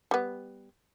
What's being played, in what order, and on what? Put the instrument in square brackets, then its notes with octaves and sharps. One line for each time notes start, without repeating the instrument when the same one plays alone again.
[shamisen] G3 B3